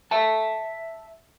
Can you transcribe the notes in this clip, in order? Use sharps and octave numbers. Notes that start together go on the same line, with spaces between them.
E5 A5